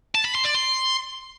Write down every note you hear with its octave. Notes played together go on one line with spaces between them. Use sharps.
A5
B5
C6
D5
C6